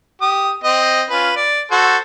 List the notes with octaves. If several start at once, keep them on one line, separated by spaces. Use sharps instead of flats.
G4 D#6
C4 D#5
C#4 F4 B4
D5
F#4 A4 C5